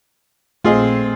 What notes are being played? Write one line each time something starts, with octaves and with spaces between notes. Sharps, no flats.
A#1 A3 C4 F4 G#4 D#5